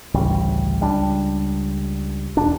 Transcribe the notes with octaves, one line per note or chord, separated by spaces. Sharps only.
A1 D2 C#3 G3
C#2 G3 D4
E1 D4